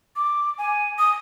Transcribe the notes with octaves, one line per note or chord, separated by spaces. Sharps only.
D6
G#5
D#6